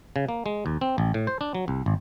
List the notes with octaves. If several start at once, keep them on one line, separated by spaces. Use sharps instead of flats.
C#3
A#3
G#3
D#2
C4
A1
A2
C5
D4
F#3
C2
G#1